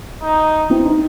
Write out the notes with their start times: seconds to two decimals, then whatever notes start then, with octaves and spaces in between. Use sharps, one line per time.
0.23 D#4
0.70 C4 E4
0.86 D#4